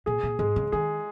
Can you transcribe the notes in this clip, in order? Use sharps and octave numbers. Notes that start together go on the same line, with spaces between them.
A#2 G#4
A#2
G#2 G#3
C#3
D#3 G#4